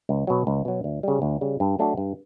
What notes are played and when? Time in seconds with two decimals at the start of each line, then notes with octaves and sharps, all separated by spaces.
0.09 C#2
0.27 B2 F#3
0.47 C#2
0.65 B2 F#3
0.84 D2
1.03 C#3 G3
1.22 D2
1.41 C#3 G3
1.60 G2
1.79 F#3 A3 D4 F#4
1.97 G2